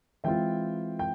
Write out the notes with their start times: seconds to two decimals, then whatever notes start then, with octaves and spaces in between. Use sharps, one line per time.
0.24 E3 G#3 C4 F4 E5 G5
0.99 G5